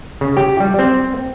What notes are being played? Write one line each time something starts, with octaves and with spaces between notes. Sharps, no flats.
C#3
G4
G3
C4